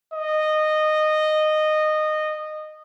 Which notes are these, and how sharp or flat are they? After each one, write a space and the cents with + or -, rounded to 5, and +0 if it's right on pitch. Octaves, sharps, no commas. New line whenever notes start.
D#5 -15